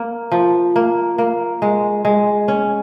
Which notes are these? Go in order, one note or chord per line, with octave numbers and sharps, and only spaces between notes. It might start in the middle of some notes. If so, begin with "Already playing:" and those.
Already playing: A#3
F3
A#3
A#3
G#3
G#3
C#4